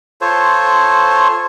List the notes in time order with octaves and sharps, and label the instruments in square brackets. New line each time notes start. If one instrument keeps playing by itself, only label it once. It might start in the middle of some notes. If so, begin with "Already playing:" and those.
[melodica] F4 A4 C5 C#5